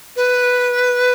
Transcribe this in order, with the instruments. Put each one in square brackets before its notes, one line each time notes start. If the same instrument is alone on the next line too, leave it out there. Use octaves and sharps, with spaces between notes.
[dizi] B4